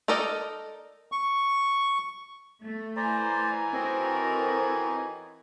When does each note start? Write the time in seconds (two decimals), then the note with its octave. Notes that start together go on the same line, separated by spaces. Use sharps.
0.08 D#4 A4 A#4 D5 D#5
1.12 C#6
2.63 A3
2.96 E3 C5 D5 G#5 A#5
3.73 C4 D#4 F#4 A4 A#4 C#5